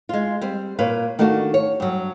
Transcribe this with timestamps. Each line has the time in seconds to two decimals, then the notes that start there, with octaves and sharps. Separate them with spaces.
0.09 G#3 F4
0.42 G3 C4
0.79 A#2 B4 C#5 F5
1.19 D#3 A3 D4 F4 F#4
1.54 C#5
1.80 G2 F#3